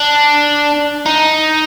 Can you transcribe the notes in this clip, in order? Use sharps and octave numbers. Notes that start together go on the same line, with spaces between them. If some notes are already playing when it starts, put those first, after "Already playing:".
Already playing: D4
D#4